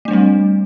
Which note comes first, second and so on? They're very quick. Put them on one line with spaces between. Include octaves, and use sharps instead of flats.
A3 D4 G3 C4